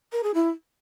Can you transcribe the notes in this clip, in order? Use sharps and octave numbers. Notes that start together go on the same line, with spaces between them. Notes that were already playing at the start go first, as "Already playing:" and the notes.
A#4
G#4
E4